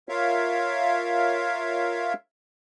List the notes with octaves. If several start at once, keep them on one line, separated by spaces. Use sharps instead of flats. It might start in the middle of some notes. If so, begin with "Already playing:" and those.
F4 A#4 C#5 E5 F5